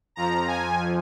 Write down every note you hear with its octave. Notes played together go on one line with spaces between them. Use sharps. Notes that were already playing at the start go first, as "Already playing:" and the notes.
F2 F3 A#5
G#5